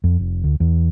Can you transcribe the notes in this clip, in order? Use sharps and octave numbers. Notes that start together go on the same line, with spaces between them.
F2
F1
D2
E2